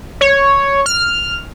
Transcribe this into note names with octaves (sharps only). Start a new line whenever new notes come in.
C#5
F6